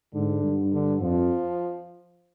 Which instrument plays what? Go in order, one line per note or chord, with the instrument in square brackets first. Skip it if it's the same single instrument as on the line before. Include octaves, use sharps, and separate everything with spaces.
[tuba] G#2 [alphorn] D3
[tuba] G2
[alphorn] D3
[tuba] F2 [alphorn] F3